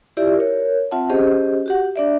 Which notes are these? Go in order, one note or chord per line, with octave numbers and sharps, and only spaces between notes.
E4 F4 G4 D5 E5
A#4 C#5
C4 F4 E5 F#5 A5
C#4 G4 G#4 C5 D#5
F#4 G4 F#5
D4 D5 E5